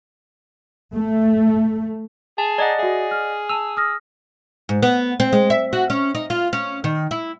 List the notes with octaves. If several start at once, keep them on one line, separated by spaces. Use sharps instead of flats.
A3
G#4 A5
D5 D#5 F#5 A#5 G#6
F#4 G#4 E5
F6
A5 E6 D#7 F7
D#6 F6 A#6
G#2
B3
C4
G#3
E5
F#4
C#4
D#4
F4
C#4
D#3
E4